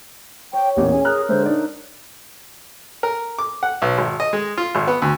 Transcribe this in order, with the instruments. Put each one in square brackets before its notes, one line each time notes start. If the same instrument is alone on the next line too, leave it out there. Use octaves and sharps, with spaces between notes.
[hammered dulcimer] C#5 [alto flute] G5
[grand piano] A1 E2 A#2 [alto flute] G4
[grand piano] C#4 G#4 [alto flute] G#5
[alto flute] G#4 [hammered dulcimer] A#4 [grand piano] F6 F#6
[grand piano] D3 G#3 [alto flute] C5 [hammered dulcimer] E5
[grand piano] D4 D5 [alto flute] D#4
[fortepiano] A#4
D6
F#5
B1
G#1
D#5
G#3
F4
G#1
B3
D2